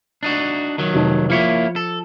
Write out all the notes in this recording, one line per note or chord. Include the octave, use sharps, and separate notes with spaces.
D4 D#4 F#4
D#3 F#3
F1 D#4 A5
F3 A#3 E4 C#5 C#7 G7
A4